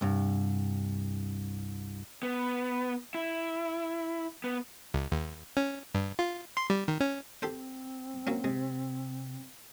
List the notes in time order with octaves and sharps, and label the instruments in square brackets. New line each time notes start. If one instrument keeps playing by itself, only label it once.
[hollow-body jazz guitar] C2 G2
[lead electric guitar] B3
E4
B3
[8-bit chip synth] C#2
D#2
C#4
G2
F4
C6
G3
D#3
C#4
[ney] C4 [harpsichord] G4 A4 C5
[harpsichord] F#3 A#3 C#4
[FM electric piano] C3 [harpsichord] G#3